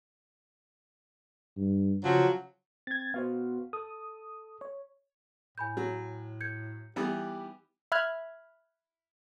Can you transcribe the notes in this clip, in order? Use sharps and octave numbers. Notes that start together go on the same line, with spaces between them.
G2
C#3 F3 F#3
C4 G#6 A6
B3 F#4 C5 F5
A4 D#6
C#5
A2 G#5 B5 G6
F#3
G6 G#6 C#7
E3 G3 B3 D#4 G4
E5 B5 F6 F#6 G#6